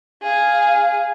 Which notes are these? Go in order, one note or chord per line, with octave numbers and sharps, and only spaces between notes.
G#4 F5